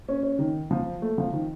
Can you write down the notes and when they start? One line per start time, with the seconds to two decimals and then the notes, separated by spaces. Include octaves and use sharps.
0.08 C#4
0.23 C#4
0.39 D#3
0.71 F3
1.02 A3
1.18 F3
1.33 D#3